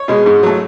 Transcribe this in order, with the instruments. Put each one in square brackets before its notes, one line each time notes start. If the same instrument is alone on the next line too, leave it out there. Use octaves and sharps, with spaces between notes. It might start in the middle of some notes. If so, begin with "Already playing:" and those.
Already playing: [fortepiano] C#5
B2 G#3
G#2
F#3 A3